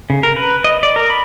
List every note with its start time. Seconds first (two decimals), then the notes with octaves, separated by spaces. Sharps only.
0.10 C#3
0.23 A#4
0.36 B4
0.64 D#5
0.83 D5
0.96 A#4
1.10 B5